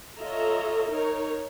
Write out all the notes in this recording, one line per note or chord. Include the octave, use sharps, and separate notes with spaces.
F4 A4 C#5 D#5 E5 A#5
D#4 A#4 C#5